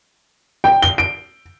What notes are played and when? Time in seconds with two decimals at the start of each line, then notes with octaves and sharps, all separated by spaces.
0.64 G5
0.82 G7
0.98 D7